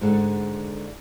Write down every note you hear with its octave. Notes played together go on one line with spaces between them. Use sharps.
G#2 D3 G#4 A4 F#5